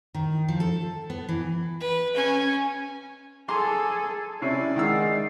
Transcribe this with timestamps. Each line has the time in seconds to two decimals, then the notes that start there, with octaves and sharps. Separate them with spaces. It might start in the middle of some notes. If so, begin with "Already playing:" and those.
0.14 D#3
0.48 F3
0.60 A4
1.10 B3
1.29 E3
1.80 B4
2.15 C#4 G#5
3.48 G#4 A4 A#5 C6 D6
4.42 C3 C#4 E4 D5 C7
4.76 D#3 G#3 F#5 E6